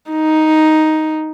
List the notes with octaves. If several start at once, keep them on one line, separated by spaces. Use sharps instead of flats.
D#4